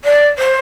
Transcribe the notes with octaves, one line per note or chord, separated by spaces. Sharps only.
D5
C5